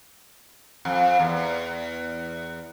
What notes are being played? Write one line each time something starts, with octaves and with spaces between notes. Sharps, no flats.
F2
E2